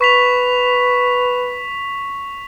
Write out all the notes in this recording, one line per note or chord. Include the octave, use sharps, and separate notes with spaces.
B4 C#6 B6 F7